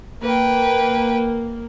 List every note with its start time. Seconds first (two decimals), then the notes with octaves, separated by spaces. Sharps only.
0.23 A#3 B4 G5